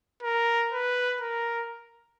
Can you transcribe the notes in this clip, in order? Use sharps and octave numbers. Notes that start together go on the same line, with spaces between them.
A#4
B4
A#4